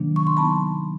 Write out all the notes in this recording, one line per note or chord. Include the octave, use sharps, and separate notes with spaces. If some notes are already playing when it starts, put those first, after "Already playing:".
Already playing: C3 D#3 F#3 A#3 D4
C#6
C6
F#3 B3 D#4 A5 B5